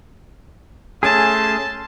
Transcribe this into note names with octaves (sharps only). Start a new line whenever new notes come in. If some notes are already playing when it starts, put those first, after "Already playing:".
A3 C#4 G#4 A5 C6